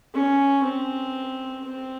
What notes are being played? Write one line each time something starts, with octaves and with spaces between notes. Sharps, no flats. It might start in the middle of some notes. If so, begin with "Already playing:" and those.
C#4
C4
C4